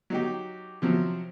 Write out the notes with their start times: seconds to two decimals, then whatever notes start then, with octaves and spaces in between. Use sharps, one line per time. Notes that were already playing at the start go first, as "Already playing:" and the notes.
0.10 F#3 D#4 G4
0.82 C3 F3 F#3